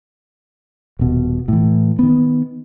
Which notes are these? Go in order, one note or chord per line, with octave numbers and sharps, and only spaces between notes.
D#1 B2
A2 E3
D#3 B3